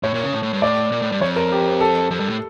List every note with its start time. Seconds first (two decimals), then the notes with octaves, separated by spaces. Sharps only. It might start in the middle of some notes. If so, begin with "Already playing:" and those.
0.03 A2 C#5
0.14 A#2
0.23 C#3
0.33 A2
0.43 A2
0.53 G2
0.62 A2 D5
0.92 A#2
1.02 A2
1.12 G2
1.21 F2 C#5
1.36 A#4
1.52 G4
1.81 A4
2.10 F2 A4
2.20 G2
2.30 A2